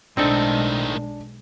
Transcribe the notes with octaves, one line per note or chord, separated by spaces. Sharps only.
B1 A2 D#3 G#3 C4 D4 D#4 A4